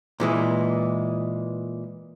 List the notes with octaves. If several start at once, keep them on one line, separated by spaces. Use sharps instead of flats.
A#2 E3 G#3